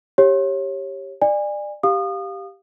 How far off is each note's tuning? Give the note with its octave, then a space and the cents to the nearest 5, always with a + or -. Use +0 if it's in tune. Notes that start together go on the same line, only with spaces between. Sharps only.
G4 +0 C#5 -20
D5 +25 G#5 -25
G4 +0 F5 +10 D#6 -30